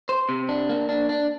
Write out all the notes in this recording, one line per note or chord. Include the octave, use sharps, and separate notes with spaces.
C5
C3
D4
A#3
D4
D4